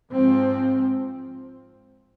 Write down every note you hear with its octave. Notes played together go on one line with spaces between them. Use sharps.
G#2 F3 C4